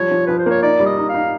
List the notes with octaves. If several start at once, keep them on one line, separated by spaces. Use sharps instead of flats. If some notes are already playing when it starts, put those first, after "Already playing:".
Already playing: F3 G3 C#5
F3
F3 B4
C5
A#3 C#5
D#4 D5
G3
D#5
D#4
F5
D#4